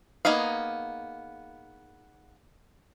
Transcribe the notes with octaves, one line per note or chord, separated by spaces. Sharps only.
A#3 B3 D#4 G#4 F5